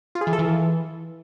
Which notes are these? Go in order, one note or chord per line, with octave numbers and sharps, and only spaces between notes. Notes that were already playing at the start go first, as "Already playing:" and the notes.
F4
G#4
E3
A4
E3